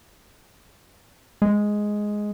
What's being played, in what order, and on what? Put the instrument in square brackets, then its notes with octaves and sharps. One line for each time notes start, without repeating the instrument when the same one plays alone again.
[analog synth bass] G#3